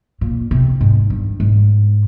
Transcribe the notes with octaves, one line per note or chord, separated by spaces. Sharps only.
A#2
C3
G#2
G2
G#2